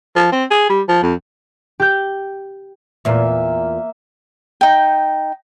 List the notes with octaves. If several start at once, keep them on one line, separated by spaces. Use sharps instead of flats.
F3
C4
G#4
G3
F3
F2
G4 G6
E2 A#2 A#3 E5
D#4 G5